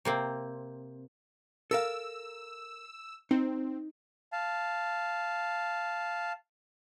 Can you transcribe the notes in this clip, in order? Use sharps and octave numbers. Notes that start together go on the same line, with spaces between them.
C3 A#3 C4
A4 A#4 F5 E6
C4 D#4
F5 A5